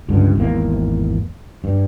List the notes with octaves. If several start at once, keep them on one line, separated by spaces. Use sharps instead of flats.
C#2 G2 D3
G#1 E2 A#3
G2